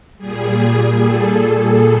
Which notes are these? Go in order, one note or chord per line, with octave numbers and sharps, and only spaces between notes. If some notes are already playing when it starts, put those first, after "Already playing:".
A#2 G3 G#4
A4
G#4